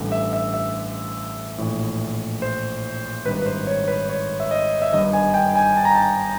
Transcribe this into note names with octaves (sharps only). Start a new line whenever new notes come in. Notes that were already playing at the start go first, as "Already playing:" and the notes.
Already playing: A1 G2 D3
E5
E5
E5
A#1 A2 E3
C5
G#1 G2 D#3 B4
B4
C5
C#5
B4
C#5
E5
D#5
E5
G1 G2 D#3 D#5
G#5
G5
G#5
A5
A#5
A5